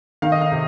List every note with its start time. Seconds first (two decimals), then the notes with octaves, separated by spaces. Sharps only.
0.22 D#3 F5
0.32 D#5
0.41 F5
0.52 C3